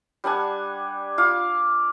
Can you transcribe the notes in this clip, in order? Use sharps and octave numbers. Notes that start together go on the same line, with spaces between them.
G3 D4 F#5 G#5
F4 F5 D6